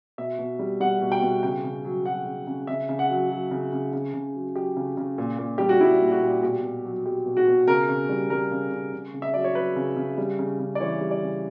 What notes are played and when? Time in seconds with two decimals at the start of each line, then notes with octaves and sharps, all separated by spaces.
0.18 B2 E5
0.39 B2
0.59 G3
0.80 G3 F#5
1.02 B2
1.12 G5
1.22 B2
1.43 C#3 G5
1.64 C#3
1.85 F#3
2.06 F#3 F#5
2.26 C#3
2.47 C#3
2.67 C#3 E5
2.89 C#3
2.99 F#5
3.10 F#3
3.30 F#3
3.51 C#3
3.72 C#3
3.93 C#3
4.14 C#3
4.34 F#3
4.56 F#3 G4
4.76 C#3
4.97 C#3
5.18 A#2
5.39 A#2
5.58 G3 G4
5.69 F#4
5.80 G3 E4
6.01 A#2
6.12 F#4
6.22 A#2
6.43 B2 G4
6.63 B2
6.84 F#3
7.05 F#3 G4
7.26 B2
7.37 F#4
7.47 B2
7.67 C#3 A#4
7.89 C#3
8.09 G3
8.30 G3 A#4
8.51 C#3
8.71 C#3
8.93 C#3
9.14 C#3
9.22 E5
9.34 F#3 D5
9.44 C#5
9.55 F#3 B4
9.76 C#3
9.96 C#3
10.18 G3
10.39 C#3
10.59 C#3
10.75 D5
10.80 E3 C#5
11.01 G3
11.11 D5
11.22 C#3